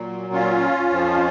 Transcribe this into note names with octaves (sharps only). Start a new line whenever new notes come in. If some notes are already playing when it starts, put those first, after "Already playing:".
Already playing: A#2 F#3
C#4 F4
F2 F3